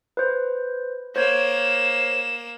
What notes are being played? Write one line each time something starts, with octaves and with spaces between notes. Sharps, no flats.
B4 C5
A#3 C5 C#5 G#6 E7